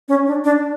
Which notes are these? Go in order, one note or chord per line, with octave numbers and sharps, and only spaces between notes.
C#4
D4
D4